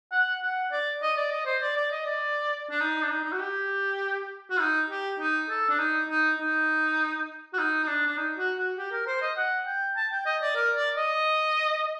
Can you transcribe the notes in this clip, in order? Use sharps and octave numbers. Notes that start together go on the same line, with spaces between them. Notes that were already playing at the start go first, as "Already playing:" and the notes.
F#5
F#5
D5
D#5
D5
D#5
C5
D5
D5
D#5
D5
D4
D#4
D4
D#4
D#4
F#4
G4
F#4
D#4
G4
D#4
A4
D4
D#4
D#4
D#4
F#4
D#4
D#4
D4
D4
D#4
F#4
F#4
G4
A#4
C5
D#5
F#5
G5
A5
G5
D#5
D5
A#4
D5
D#5